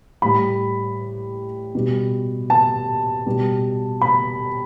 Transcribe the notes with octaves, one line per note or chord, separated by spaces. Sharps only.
A2 G3 B5
B2 G3
A5
B2 G3
B5